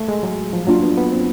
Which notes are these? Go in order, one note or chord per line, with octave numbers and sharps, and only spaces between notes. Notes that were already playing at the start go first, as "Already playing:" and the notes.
Already playing: A3
G#3
F#3
F3
F#3 A#3 D4 F4
B3
B3
C4